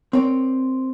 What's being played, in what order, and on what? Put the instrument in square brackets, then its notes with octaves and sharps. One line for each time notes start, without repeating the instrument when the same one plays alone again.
[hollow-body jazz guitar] C4 A#4 C#5 D5